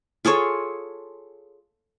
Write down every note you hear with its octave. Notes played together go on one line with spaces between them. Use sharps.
F4 G#4 A4 C#5